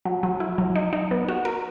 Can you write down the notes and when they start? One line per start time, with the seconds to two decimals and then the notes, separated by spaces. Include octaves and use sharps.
0.05 F#3
0.23 F#3
0.40 E4
0.58 F#3
0.75 D#4
0.93 D#4
1.11 B3
1.28 F#4
1.45 A#4